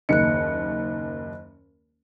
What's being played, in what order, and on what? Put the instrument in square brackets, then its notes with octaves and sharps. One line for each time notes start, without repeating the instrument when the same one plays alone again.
[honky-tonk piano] F#1 D#2 C#7 [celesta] D#5 F#6